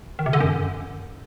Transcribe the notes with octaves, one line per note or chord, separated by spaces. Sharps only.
D#3
C3
D3
F#2